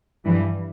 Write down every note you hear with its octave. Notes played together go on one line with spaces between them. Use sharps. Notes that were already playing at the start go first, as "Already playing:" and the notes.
G2 E3 G3